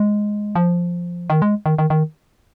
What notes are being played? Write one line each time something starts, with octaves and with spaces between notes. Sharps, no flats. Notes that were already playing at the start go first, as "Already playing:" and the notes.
Already playing: G#3
F3
D#3
G#3
D#3
D#3
D#3